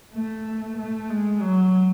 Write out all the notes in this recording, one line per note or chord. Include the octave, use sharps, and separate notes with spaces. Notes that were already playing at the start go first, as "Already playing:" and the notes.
A3
A3
G#3
F#3